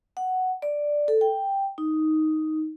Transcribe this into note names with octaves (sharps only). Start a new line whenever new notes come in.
F#5
D5
A4
G5
D#4